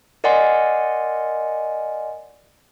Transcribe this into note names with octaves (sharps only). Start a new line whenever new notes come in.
A#4 D5 D#5 F#5 G#5 C6